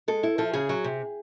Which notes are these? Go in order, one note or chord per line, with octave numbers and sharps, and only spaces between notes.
G#3 A4
E4
F3 A4
C#3 G#4
F#3
C3